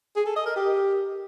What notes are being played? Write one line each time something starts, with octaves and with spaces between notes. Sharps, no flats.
G#4
A4
D#5
A#4
G4